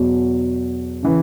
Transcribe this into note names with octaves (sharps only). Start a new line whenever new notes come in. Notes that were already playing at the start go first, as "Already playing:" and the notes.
Already playing: E2 B2 F#3
C#3 E3